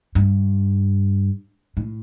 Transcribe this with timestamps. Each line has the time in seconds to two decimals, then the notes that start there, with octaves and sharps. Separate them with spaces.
0.15 G2
1.77 A2